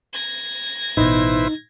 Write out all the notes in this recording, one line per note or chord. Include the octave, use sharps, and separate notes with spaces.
G#6 A#6
A1 B2 D#4 E4 B4 C5